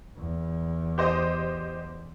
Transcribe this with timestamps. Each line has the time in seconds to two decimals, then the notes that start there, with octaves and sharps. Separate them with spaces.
0.17 E2
0.98 G4 C5 D#5